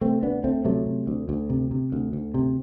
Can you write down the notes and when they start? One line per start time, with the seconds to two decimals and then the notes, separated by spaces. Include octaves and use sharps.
0.01 C3 A3 C4
0.23 D2 B3 D4
0.44 D2 A3 C4
0.65 C3 F#3 A3
0.86 C3
1.07 D2
1.29 D2
1.50 C3
1.71 C3
1.92 D2
2.13 D2
2.34 C3